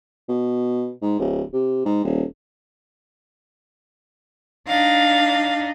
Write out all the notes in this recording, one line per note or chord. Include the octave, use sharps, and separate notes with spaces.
B2
G#2
D1
C3
G#2
D#1
D4 D#4 F5